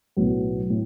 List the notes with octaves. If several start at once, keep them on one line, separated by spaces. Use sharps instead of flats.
B1 A2 F#3 B3
A2